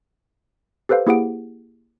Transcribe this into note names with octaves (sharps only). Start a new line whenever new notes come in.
G4 A4 B4 C5 F5
A#3 E4 G4 G#4 F#5 D7